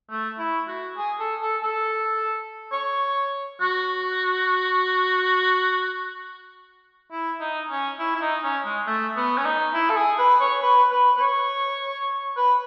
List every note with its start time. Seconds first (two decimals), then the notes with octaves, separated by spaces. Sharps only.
0.10 A3
0.39 E4
0.68 F#4
0.97 G#4
1.19 A4
1.42 A4
1.63 A4
2.72 C#5
3.61 F#4
7.11 E4
7.40 D#4
7.69 C#4
7.99 E4
8.15 E4
8.21 D#4
8.43 C#4
8.65 G#3
8.86 A3
9.16 B3
9.38 C#4
9.45 D#4
9.74 E4
9.90 A4
9.97 G#4
10.19 B4
10.40 C#5
10.62 B4
10.91 B4
11.17 B4
11.20 C#5
12.37 B4